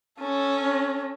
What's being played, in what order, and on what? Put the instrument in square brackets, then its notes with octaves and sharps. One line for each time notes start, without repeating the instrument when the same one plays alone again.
[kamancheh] C#4 A4